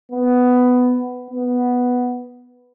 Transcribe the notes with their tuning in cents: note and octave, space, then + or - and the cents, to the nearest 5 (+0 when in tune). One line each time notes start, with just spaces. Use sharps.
B3 +10
B3 +0